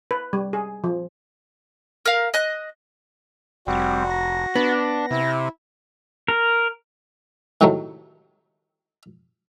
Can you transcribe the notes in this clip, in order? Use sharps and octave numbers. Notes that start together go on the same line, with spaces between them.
B4
G3
G#4
F3
A#4 F5
D#5 F#6
F1 G3 C4 F#4
A#6
B3 D4
C3 E4
A#4
A2 C3 D#3 F#3 A3